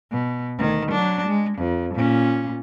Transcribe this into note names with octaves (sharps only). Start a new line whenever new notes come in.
B2
D2 D#3
F#3 D4
G#3
F2
A#2 C#4